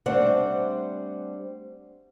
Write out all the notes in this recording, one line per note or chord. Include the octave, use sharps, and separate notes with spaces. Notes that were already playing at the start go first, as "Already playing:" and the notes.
G3 A3 C4 D4 C5 F#5